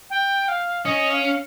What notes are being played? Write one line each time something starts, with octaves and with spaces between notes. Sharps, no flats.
G5
F5
C#4 D#5
F5